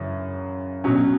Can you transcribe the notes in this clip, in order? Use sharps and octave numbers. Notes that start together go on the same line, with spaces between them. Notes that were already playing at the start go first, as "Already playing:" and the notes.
Already playing: F#2 C#3 E3
B2 F#3 C#4